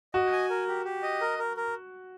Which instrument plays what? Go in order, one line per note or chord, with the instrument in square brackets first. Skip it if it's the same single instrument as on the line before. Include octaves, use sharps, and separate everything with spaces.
[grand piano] F#4 [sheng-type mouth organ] D#5
[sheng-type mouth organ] G#5
A#4
G4
G4
D#5
A#4
A#4
A#4